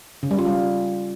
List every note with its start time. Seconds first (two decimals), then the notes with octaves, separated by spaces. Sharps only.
0.23 C#3
0.31 G3
0.39 F4
0.46 G3